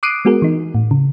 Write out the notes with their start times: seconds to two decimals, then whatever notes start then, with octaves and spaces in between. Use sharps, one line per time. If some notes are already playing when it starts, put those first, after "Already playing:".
0.03 D6 D#6 F#6 C7 D7 D#7
0.25 G#3 B3 F#4 G#4 A#4
0.42 E3 D#4
0.74 A2
0.91 C#3